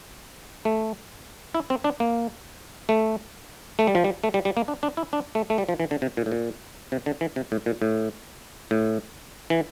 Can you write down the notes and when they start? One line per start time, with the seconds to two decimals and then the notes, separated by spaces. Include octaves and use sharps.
0.65 A3
1.55 E4
1.70 C4
1.84 D4
2.00 A#3
2.89 A3
3.79 A3
3.87 G3
3.95 F3
4.04 G3
4.24 A3
4.34 G3
4.45 G3
4.57 A#3
4.68 D4
4.83 D4
4.97 E4
5.13 D4
5.35 A3
5.50 A3
5.58 G3
5.69 F3
5.80 E3
5.91 D3
6.02 C3
6.17 A#2
6.26 A2
6.32 A#2
6.92 C3
7.06 D3
7.21 E3
7.36 C3
7.52 A2
7.66 A#2
7.82 A2
8.71 A2
9.50 E3